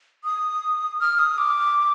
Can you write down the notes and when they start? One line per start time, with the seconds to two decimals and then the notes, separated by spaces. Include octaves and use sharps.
0.24 D#6
1.00 F6
1.19 D#6
1.38 D6